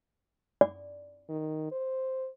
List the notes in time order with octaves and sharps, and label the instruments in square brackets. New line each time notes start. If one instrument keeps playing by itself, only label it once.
[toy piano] D5
[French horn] D#3
C5